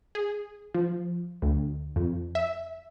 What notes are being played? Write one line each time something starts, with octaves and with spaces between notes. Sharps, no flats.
G#4
F3
D2
F2
E5